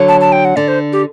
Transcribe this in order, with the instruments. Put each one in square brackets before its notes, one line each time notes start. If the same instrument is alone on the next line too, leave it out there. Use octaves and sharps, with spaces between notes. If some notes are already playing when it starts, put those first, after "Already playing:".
Already playing: [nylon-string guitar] D3 F#3
[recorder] A5
A5
G5
F#5
[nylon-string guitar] D3 [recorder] D5
[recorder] C5
G4